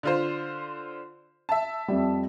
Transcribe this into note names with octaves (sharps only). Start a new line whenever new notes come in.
D3 F4 C5
E5 A5
F2 G3